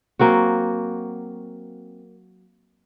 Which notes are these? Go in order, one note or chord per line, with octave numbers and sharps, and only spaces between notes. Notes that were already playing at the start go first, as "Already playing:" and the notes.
F#3 A#3 C4 F#4